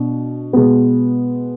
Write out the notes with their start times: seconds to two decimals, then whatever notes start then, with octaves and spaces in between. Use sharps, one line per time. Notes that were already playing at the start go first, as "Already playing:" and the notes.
Already playing: B2 D4
0.53 B2 G#3 B3